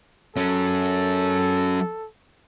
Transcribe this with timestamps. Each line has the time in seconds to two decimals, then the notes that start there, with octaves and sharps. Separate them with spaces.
0.36 F#3 C#4 A4